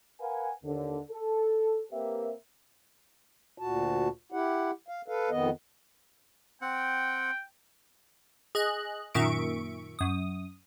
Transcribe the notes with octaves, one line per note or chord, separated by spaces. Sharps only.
A#4 B4 F5 F#5 G#5
D#2 D3
A4
A#3 C4 G4 A#4 B4 E5
D2 A#2 F#4 A5
E4 G4 F#5
F5
A4 B4 F5
F2 D#3 B3 D#5
C4 F#5 G5
G#4 D#5 F#6
F#2 A#2 D#3 E5 C#6 D7
F#2 D#6